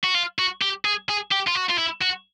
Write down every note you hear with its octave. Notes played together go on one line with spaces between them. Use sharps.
F#4
F4
F#4
G4
G#4
G#4
G4
F4
F#4
F4
E4
F#4